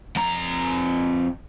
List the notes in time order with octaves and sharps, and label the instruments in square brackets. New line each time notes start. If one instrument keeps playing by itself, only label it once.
[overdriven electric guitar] F2 A#5